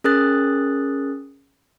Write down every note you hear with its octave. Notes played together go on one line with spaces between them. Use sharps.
C#4 G#4 A#4 D#6 F#6 A6